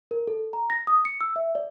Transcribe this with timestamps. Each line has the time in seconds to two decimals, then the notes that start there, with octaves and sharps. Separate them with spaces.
0.11 A#4
0.27 A4
0.53 A#5
0.70 A#6
0.87 D#6
1.05 C#7
1.21 E6
1.36 E5
1.55 D5